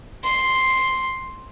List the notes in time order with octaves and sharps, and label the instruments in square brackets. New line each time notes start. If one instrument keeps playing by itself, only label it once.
[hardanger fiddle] C6